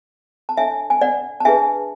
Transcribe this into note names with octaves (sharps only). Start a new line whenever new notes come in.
A5
D4 A4 C#5 E5 G#5
G#5
D5 F#5
A5
D4 G#4 B4 E5 G#5